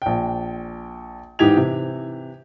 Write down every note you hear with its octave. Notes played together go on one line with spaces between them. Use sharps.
A#1 G5
G#2 E3 D#4 G4 G#6 F7
C3 E3